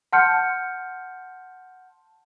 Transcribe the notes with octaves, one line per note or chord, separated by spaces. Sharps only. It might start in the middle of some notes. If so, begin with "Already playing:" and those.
F#5 A5 C6 F6 G6 C#7